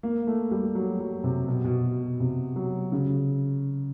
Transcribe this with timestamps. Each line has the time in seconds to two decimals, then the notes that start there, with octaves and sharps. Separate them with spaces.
0.03 A#3
0.27 A3
0.51 G3
0.75 F#3
1.00 F#3
1.24 C3
1.48 B2
1.65 B2
2.20 C3
2.56 F#3
2.92 C#3